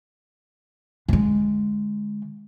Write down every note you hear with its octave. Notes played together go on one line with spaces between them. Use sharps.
D3 G#3